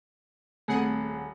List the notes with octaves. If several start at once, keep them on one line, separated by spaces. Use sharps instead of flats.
D#1 A3 C4 G#4 F#5